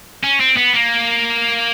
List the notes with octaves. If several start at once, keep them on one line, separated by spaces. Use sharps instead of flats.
C#4
C4
B3
A#3